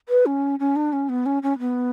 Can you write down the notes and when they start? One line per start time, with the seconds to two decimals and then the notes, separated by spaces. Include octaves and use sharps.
0.09 B4
0.26 C#4
0.60 C#4
0.76 D4
0.93 C#4
1.09 B3
1.26 C#4
1.43 C#4
1.59 B3